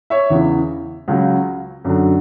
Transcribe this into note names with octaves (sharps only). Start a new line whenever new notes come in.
C#5 E5
E2 C#3 E3
C#2 C#3 F#3
F#2 D3 F#3